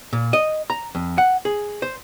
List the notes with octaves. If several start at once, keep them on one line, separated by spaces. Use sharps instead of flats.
A#2
D#5
A#5
F2
F#5
G#4
C5